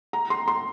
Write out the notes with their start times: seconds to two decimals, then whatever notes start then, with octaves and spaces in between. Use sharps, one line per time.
0.13 A#5
0.30 C6
0.48 C6